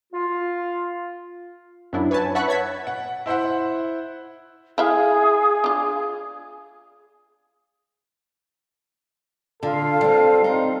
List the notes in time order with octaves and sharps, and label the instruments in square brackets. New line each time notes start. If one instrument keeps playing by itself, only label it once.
[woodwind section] F4
[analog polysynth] F#2 F#3 D4 E4
B4 C#5 G#5 A5
E5 F#5 A5 B5 C#6 F#6
C#5 A5 G#6 B6
[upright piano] F#5
E4 C5 E5 F#5
[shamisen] E4 E5 F5 [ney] G#4
[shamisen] D4 F4
[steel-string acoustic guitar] D3 [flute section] F4 F5 [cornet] A4
[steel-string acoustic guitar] G3 C4
[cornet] C4 [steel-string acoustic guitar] D#4